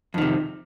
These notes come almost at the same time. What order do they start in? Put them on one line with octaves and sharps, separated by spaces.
F2 D#3 C3